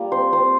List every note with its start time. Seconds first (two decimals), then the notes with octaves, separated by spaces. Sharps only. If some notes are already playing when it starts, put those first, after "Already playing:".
Already playing: G3 A#3 F4
0.12 C4 C5
0.32 C4 C5